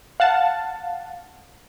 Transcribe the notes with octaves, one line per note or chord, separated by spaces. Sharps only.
F5 F#5 A5